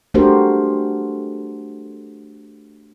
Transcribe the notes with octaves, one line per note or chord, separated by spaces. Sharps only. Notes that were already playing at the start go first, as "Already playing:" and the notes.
A3 D4 F#4 G4 A#4 C5